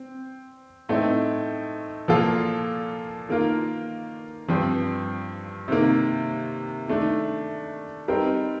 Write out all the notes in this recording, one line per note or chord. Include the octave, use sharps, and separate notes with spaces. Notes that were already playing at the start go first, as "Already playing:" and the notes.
Already playing: C4
A2 A3 C4 D#4
A#2 F3 A#3 F4 A4
D#3 A#3 F4 A#4
G2 F3 C4
C3 D#3 A#3
D#3 A3 D4
G3 C4 D#4 A#4